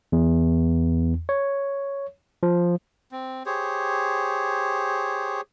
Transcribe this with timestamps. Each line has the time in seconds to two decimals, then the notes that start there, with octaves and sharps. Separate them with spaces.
0.12 E2
1.29 C#5
2.43 F3
3.12 C4
3.46 G4 G#4 C5 C#5